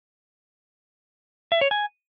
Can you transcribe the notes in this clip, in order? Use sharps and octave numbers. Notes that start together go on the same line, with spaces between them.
E5
C#5
G#5